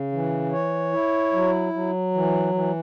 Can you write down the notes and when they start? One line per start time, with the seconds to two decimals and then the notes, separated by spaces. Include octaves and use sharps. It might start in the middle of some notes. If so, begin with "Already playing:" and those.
Already playing: C#3
0.12 E3
0.52 C#5
0.93 E4
1.33 F#3
1.73 F#3
2.14 E3
2.54 E3